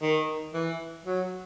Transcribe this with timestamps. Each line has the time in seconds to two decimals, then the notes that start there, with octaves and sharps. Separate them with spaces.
0.02 D#3
0.54 E3
1.06 F#3